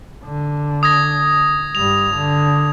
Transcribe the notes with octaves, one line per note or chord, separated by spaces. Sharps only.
D3
D#6 G#6 A#6
G2 G3 F7
D3